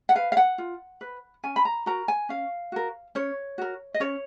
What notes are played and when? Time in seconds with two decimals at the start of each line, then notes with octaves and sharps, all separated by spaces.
0.09 F#5
0.15 B4 F5
0.32 F5
0.37 F#5
0.58 F4
1.01 B4
1.44 C#4 G#5
1.56 B5
1.65 A#5
1.86 F#4 A#4 A#5
2.08 G#5
2.29 C#4 F5
2.72 F#4 A#4
3.15 C#4 C#5
3.58 F#4 A#4
3.94 D#5
4.00 C#4 C#5